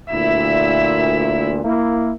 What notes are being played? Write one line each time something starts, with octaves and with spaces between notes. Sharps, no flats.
D2 A#2 E4 E5
A#3 E4